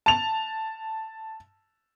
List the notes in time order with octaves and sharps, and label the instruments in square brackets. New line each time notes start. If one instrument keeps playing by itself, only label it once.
[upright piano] A5 F7